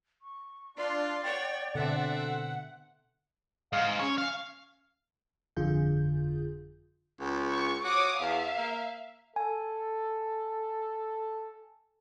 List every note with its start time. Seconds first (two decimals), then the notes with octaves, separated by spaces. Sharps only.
0.22 C#6
0.77 D4 F4 D5 C6
1.23 C#5 F#5 G5
1.75 B2 D3 C4 A4 E5 F#5
3.73 G#2 F5
4.00 C#4 C#5
4.18 F5
5.57 G1 F2 D3 F4 G#4 G6
7.20 C#2
7.54 C#6
7.84 F#4 C#5 D6 D#6
8.20 E2 E5 F5
8.58 A#3
9.36 A4 G#5